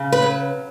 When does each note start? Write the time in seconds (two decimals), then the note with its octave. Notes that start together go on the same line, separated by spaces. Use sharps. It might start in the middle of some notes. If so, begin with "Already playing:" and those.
Already playing: C#3
0.12 B4
0.22 F#3